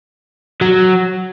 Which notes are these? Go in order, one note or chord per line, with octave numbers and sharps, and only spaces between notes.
F#3